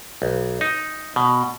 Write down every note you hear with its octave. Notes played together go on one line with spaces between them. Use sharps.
B1
D#4
B2